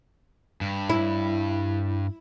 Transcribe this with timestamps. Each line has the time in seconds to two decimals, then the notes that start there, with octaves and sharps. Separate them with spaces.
0.61 G2
0.90 E4